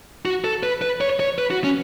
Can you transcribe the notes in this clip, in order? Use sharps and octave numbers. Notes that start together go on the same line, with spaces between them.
F#4
A4
B4
B4
C#5
C#5
B4
F#4
C#4